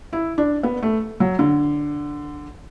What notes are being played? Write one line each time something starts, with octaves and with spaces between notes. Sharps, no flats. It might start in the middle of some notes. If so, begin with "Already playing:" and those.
E4
D4
B3
A3
F#3
D3